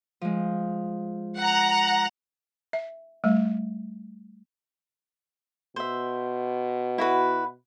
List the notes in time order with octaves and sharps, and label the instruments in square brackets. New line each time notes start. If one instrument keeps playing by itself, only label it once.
[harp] F3 G#3
[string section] F#5 A#5
[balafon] E5
G3 A3
[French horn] B2 [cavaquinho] C5 E5
[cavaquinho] E4 F#4 B4